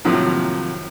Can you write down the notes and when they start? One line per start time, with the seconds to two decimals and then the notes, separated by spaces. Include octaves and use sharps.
0.05 A2 C3 D#3 F3 F#3 A#3